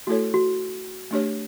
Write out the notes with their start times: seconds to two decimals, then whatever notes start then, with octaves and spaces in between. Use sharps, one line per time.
0.07 A3 E4 F#4 A4 C#5
0.34 F#4
1.11 A3 D4 G4 C#5